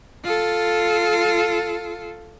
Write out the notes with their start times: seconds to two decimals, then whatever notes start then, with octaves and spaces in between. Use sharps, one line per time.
0.24 F4 A4